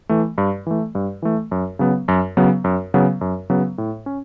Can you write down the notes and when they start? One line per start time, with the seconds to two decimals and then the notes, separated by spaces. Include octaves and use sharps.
0.09 E3 A3
0.38 G2
0.67 E3 A3
0.95 G2
1.22 E3 A3
1.51 F#2
1.79 C#3 F#3 B3
2.08 F#2
2.37 C#3 F#3 B3
2.64 F#2
2.94 C#3 F#3 B3
3.21 F#2
3.50 C#3 F#3 B3
3.78 A2
4.06 C#4